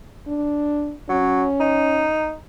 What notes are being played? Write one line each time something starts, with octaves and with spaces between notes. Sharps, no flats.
D4
F#3 C#4
D#4